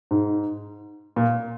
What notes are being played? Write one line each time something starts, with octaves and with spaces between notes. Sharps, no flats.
G#2
A#2